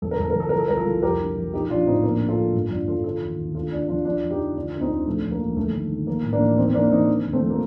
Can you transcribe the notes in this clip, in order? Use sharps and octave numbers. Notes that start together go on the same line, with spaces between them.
G1 A4
A#4
G1 A4
A#4
G1
A4
F3 A#4
A4
C2 A#4
F4 A4
C2
F1 G4 A#4
D3
F3
A#1 D#4 G4
A#1 D4 F4
A2 C4 D#4
A#1 A#3 D4
A#1
F4 A4
A#1
G2
G1 D4 F4
G1 F4 A4
D3 F4 A4
D#2
D#2
D2 F4 A4
D2 D4 F4
F3 D4 F4
F3 D4 F4
F2
D#4 G4
D3
D2 D4 F4
D2
C4 D#4
D2
A#1 A3
A#1
A#3
A#1
G1 A3
D#3
D#3
F3 A#3
A2
A#3 D4
A1
A1 C4 D#4
C4
A1 A#3 D4
A1 C4 D#4
D3
D#2
A3 C4
F3
A#3